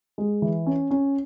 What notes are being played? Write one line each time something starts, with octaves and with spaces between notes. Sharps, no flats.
G#3
E3
C#4
C#4